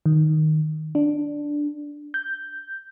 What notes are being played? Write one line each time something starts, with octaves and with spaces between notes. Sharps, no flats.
D#3
D4
G6